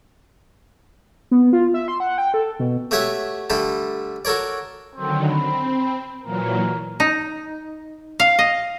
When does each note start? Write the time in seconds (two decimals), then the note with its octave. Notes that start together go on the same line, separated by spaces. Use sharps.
1.31 B3
1.53 F4
1.74 E5
1.88 C6
2.00 F#5
2.18 G5
2.34 A4
2.60 B2
2.91 A3 F#4 G4 C#5 E5 F#5
3.50 D3 G3 A3 A4
4.25 F#4 A4 A#4 C#5 D5
4.96 D3 D#3 F#3 C4
5.30 C4 B5
6.24 A#2 E3 F#3 A#4
7.00 D#4
8.20 F5
8.39 D#5